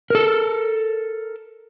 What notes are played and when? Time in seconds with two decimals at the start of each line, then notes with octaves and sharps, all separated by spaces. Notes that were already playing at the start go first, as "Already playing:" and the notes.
0.10 A4 A#4